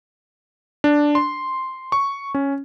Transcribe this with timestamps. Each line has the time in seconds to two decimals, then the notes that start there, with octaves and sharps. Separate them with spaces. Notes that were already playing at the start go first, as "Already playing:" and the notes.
0.84 D4
1.15 C6
1.92 C#6
2.34 C#4